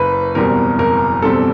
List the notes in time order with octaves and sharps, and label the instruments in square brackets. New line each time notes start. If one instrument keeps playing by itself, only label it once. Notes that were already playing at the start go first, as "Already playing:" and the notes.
Already playing: [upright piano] F#1 [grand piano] B4
[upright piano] E2 B2 G3 C4 [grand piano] A#4
[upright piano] F#1 [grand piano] A#4
[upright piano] E2 B2 G3 C4 [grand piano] A4